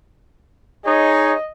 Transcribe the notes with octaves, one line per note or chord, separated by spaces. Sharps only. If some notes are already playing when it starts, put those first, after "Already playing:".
D#4 G#4 C#5 D#5